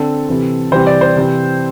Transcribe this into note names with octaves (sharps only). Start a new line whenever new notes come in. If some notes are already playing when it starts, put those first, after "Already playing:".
Already playing: D3 C4 A4
C3 E3 C4
C3 E3 G3 C4 C5
D5
C5
C3 E3 C4